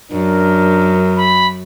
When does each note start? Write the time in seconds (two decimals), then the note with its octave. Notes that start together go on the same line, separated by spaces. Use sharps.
0.12 F#2 D4 A#4
1.17 B5